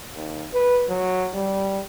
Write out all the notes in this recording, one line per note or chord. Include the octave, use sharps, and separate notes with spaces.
D#2
B4
F#3
G3